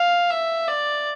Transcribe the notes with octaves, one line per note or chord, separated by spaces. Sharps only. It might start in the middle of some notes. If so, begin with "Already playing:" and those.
Already playing: F5
E5
D5